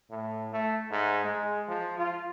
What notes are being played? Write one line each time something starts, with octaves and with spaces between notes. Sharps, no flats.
A2
A3
G#2
G#3
F3
F4